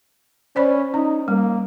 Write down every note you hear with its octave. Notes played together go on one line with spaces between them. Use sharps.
C#4 C5 D5 B5
C#4 D#4
G3 A#3